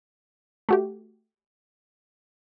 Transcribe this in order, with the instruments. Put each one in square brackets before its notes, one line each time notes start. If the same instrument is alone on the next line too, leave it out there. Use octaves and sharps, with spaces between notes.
[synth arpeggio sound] A3 F#4 G4